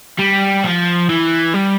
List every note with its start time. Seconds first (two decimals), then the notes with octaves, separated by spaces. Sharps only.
0.19 G3
0.64 F3
1.10 E3
1.54 G3